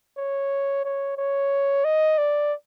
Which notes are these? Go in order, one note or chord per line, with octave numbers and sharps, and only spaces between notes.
C#5
C#5
C#5
D#5
D5